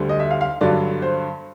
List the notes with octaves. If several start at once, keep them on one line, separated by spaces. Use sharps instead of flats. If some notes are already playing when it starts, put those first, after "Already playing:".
Already playing: D2 D3 G3
D#5
E5
F5
F5
G2 D3 F#3 D5
C5